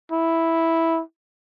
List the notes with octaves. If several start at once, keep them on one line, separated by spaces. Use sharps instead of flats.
E4